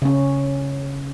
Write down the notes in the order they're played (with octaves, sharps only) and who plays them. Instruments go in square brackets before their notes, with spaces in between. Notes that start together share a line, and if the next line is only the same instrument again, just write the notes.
[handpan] C#3 C#4